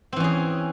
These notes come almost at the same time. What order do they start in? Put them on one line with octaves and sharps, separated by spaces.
C4 E3 C#4 G#4